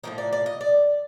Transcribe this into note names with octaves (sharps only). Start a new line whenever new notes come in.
A2 F3 A#3 D#4
D5
D5
D#5
D5